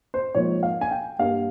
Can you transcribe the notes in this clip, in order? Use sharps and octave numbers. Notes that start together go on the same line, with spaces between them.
C5
G#2 F3 A#3 C#5
F5
G#5
G5
G2 G3 A#3 F5